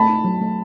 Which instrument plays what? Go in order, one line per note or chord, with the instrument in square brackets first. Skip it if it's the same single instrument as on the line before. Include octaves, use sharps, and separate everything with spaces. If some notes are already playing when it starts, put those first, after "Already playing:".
Already playing: [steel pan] A3 [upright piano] A5 B5
[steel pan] D#4
F#3
A3